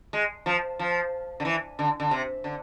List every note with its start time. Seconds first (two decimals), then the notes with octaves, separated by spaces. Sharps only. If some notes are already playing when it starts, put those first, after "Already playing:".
0.13 G#3
0.46 F3
0.79 F3
1.40 D3
1.45 E3
1.79 D3
2.00 D3
2.11 C3
2.44 D3